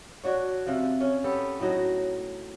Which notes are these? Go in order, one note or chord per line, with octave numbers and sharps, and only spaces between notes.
D4 F#4 C#5
C3 F3
C#4
B3 G4 A4
A2 F#3 D#4